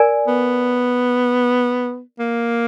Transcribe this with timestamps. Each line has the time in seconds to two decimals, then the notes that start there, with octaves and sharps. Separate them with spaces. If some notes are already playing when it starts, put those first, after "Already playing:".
Already playing: A#4 D5 G#5
0.27 B3
2.19 A#3